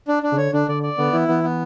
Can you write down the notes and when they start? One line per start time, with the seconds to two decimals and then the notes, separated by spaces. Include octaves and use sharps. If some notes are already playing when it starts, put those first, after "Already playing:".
0.08 D4
0.23 D4
0.32 C#3
0.37 D3 C#5
0.53 D3 D4
0.68 D3 D5
0.83 D5
0.97 D3 B3
1.12 E3 E4
1.28 E3 B3
1.43 B3